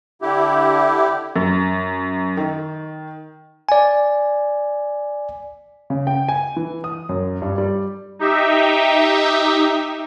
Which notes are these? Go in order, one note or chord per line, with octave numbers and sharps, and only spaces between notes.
D3 E4 G4
F#2
D#3
D5 G#5
C#3
G5
G#5
E3
D#6
F#2
G2
G3
D#4 G4 E5